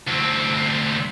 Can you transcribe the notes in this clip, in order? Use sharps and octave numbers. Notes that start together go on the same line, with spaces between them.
D2 C4